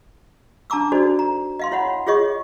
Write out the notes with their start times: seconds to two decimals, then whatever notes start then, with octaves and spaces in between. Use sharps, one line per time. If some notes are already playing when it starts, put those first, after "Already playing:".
0.70 D4 A5 A#5 D6 E6
0.92 D4 D#4 F#4 A4 C5 D5
1.19 A#5
1.59 D#5 F5 C6
1.71 E4 C#5 F#5 B5
2.07 F4 G#4 C#5 D#5 C#6